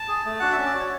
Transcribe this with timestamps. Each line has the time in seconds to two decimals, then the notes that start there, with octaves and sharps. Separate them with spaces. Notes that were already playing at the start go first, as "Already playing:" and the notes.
Already playing: A5
0.08 G#4
0.26 A3
0.40 D4 F#4 F#5
0.52 E5
0.58 C#4
0.66 D5
0.75 F#4 C#5